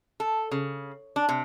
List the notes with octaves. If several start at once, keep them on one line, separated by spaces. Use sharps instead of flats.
A4
C#3
D4
C3